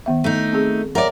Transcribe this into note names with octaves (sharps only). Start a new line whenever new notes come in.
D#3 B3 E5
A3 D#4
C4 G#4
A#4 C#5 D5 E5 F#5